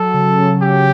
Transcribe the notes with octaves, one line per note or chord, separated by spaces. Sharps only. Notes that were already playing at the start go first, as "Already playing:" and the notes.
Already playing: F#3 A4
C#3
C#3
C#4 G4